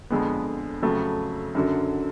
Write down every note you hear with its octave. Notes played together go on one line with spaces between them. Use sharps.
F2 D3 G#3 B3
F2 C#3 F#3 A3
F#2 D3 F#3